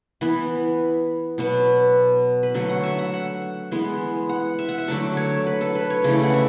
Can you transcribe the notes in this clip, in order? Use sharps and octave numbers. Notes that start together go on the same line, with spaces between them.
E3 B3 B4
B2 F#3 B3
B4
D3 F#3 A3 A4
F#5
E5
F#5
F#5
E3 G#3 B3
F#5
E5
F#5
E5
D3 F#3 A3 D5
C#5
B4
A4
B4
C#5
C#3 E3 A3 D5
F#5
E5